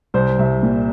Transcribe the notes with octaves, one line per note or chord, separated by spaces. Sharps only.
C2 C5
C2 E5
A#2